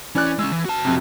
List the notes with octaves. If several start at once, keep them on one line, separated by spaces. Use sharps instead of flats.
E3 C#4 D5 F#6
G#3 C#4 E6
E3
F#4 A5
F2 C3